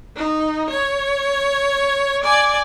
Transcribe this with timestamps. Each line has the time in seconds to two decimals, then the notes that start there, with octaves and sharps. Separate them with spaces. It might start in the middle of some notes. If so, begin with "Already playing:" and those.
0.17 D#4
0.70 C#5
2.24 D5 G#5